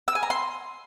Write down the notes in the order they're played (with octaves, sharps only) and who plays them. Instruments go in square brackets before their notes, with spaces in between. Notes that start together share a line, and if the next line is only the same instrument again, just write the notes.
[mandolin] E6
G#5
A#5
C6